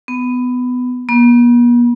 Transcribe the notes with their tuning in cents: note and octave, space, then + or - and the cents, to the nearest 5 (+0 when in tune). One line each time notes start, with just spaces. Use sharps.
B3 +15
B3 -45